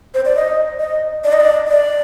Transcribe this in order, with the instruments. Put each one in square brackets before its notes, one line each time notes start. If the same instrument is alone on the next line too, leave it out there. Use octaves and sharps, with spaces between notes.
[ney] C5
D5
D#5
D#5
D5
D#5
D5
D5